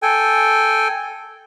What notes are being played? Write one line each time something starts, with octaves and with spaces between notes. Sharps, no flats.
A4 G5 G#5